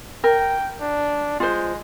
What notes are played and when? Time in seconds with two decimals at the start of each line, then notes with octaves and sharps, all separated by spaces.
0.24 A#4 G5
0.80 D4
1.40 G#3 F4 C5